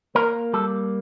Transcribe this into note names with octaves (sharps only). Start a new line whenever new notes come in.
A#3 A#4
G3 A4